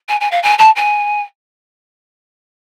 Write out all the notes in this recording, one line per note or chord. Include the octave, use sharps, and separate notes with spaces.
G#5
G#5
F5
G#5
A5
G#5